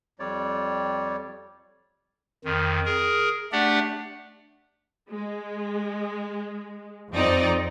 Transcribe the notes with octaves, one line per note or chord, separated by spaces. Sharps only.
F2 G3 C#5 D5
F2 D#3
G#4 A#4
A3 D4 G4 D5 F#5
G#3
F2 C4 D#4 D5